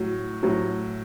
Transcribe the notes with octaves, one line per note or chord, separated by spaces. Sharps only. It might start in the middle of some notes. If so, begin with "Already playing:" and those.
Already playing: A2 F#3
A2 F#3